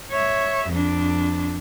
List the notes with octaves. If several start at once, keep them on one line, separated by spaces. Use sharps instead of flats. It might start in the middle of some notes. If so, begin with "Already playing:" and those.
C#5 E5
F2 D4